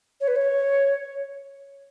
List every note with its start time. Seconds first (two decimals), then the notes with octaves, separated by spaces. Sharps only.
0.21 C#5
0.27 B4
0.36 C#5